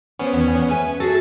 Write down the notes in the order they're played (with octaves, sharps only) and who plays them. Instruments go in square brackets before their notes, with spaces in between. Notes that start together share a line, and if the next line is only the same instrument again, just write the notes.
[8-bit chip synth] B3 C#4 [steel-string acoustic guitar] C5 D5
[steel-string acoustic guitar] E2 D#3
B4 E5 G#5
[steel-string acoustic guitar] F#4 G#4 E5 [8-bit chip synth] A4 A6